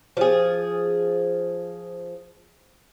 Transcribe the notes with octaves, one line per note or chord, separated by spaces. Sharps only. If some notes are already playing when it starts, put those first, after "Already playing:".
F3 G#4